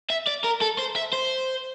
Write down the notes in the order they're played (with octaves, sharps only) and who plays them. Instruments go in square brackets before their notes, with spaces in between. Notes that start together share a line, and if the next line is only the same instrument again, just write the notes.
[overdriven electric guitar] E5
D5
A#4
A4
C5
E5
C5